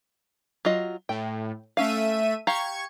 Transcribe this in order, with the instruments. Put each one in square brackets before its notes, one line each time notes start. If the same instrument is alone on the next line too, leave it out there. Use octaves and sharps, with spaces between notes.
[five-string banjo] F#3 F4 D#5
[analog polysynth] A2 [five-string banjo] G5
[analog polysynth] A3 E5 D#7 [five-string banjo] C#4 F5
[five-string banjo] G4 F5 A#5 [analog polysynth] C#6 G#6